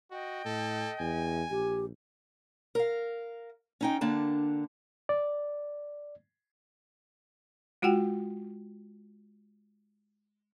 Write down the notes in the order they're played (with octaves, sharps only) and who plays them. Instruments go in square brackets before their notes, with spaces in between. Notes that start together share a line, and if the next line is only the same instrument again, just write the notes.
[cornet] F#4 [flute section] D#5 G5
[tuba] A2 [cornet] A4
[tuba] E2 [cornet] G#5
[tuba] A#1 [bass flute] G4
[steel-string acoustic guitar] A#4 F5
C#4 D#4 G5
D3 A#3 D4 A5
[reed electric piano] D5
[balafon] G#3 F4 F#4 F#5 G5